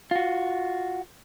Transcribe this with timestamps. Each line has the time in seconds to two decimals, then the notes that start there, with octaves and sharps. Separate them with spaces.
0.11 F4 F#4